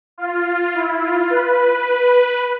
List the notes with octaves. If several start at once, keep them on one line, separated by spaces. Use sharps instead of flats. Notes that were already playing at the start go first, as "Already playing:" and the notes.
F4
E4
F4
B4